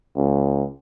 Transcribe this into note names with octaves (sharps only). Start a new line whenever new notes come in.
C#2